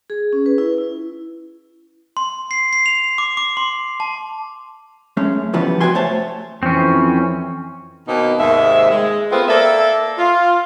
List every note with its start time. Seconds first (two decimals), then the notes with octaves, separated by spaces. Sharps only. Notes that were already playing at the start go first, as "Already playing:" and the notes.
0.10 G#4
0.33 C#4
0.46 B4
0.58 E4
0.78 E4
2.17 C6
2.51 C7
2.73 C7
2.86 F7
3.18 D6
3.37 D6
3.57 C6
4.00 A5
5.17 F#2 G#3 A3 C#4
5.53 B1 C#3 E3 F3 G3 B3
5.80 F#4 B4 G5 G#5 C6
5.95 C2 A3 C5 C#5 A5
6.63 F2 E3 C4 C#4
8.07 B2 D#3 A#3 C4 D#4
8.38 D#2 G#2 C3 G#3 E5
8.90 G#3
9.31 A3 B3 C4 F4
9.48 A#3 E4 A4 D5 E5
10.17 F4